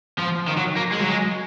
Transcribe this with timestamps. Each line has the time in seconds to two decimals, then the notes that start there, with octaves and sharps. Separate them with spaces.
0.19 F3
0.48 D#3
0.57 F#3
0.76 A#3
0.92 G#3
1.00 F#3
1.07 G#3